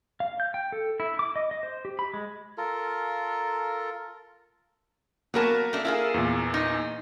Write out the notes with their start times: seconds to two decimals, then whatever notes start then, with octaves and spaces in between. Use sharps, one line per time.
0.20 F5
0.40 G6
0.54 G5
0.72 A4
1.00 E4
1.19 D6
1.36 D#5
1.51 D#5
1.63 C5
1.85 G4
1.99 B5
2.14 G#3
2.58 F4 A4 A#4
5.34 F#3 A#3 B3 A#4 A5
5.73 A3 D4
5.85 E4 F4 G#4
6.14 E2 A#2
6.54 D#4